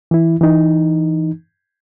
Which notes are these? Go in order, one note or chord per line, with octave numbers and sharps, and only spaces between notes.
E3 E4
E3 D#4